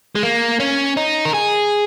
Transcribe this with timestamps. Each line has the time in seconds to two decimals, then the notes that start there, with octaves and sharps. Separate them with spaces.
0.15 G#3
0.23 A#3
0.60 C#4
0.97 D#4
1.25 A#4
1.34 G#4